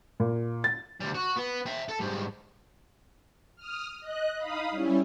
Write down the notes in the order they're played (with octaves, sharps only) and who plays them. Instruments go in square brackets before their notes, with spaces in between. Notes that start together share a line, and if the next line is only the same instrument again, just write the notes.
[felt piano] A#2
A6
[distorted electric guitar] D2 G3
F#4
B3
E5 G5
A4
G#2 G3
[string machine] D#6 F6
D#5 F#6
D#4 F5 B5 D#6
G3 C#4 E4